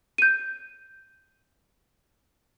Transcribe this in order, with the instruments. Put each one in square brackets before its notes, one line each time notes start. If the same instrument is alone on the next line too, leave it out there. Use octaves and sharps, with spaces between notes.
[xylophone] G6 D#7